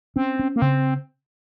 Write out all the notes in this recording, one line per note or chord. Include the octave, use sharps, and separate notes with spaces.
C4 C#4
C#4
A#3
C#3 C4